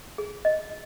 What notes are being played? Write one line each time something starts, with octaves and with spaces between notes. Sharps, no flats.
G#4
D#5